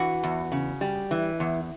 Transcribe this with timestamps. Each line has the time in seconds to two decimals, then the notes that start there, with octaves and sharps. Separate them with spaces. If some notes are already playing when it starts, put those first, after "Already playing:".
Already playing: E3 F#4
0.24 E2
0.52 C#3
0.81 G3
1.11 E3
1.40 E2